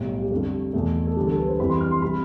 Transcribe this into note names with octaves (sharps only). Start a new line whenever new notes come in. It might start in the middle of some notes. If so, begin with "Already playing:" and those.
Already playing: B1 A2 G3 F5
G4
F2 D3 G3 A4
E2 B2 A3
A4
E1 D2 D3 G3 G4
A4
B4
C5
F2 E3 G3 B5
C6
F6
C6
C3 G3 B5